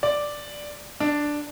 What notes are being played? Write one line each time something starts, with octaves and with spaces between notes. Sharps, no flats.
D5
D4